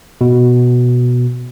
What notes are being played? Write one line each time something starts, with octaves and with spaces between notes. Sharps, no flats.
B2